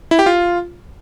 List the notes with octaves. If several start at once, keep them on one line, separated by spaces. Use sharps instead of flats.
E4
G4
F4